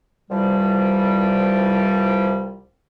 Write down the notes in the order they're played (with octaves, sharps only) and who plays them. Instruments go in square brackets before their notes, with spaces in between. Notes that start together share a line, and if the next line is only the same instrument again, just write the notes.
[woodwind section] C2 E3 F3 G3